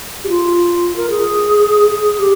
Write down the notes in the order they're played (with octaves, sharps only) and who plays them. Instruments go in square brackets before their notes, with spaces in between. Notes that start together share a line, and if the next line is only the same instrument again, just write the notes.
[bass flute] G4
F4
A#4
G#4
G#4
G4